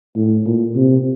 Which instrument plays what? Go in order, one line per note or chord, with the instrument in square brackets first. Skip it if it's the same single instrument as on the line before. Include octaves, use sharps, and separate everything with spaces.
[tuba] A2
A#2
C3